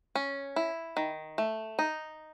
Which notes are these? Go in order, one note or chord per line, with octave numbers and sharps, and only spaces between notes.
C#4
E4
D#3
A3
D#4